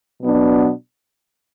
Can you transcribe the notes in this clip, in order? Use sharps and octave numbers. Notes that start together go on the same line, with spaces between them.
B2 F#3 B3 D4